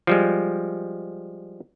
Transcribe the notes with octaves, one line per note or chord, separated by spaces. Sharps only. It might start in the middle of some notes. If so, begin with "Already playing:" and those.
F3 G3 G#3